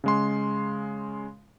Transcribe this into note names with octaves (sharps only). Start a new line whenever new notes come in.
C#3 G#3 C6